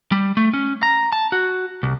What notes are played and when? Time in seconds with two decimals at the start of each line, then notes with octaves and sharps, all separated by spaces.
0.12 G3
0.37 A3
0.54 C#4
0.83 A#5
1.13 A5
1.32 F#4
1.83 C2